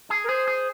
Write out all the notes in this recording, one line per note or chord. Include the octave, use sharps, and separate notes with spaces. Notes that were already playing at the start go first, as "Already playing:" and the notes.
G#4
A#4
G#4 C5
G#4